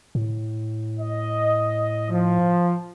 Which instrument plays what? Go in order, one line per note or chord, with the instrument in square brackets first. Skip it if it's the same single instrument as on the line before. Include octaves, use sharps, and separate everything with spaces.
[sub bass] A2
[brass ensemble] D#5
F3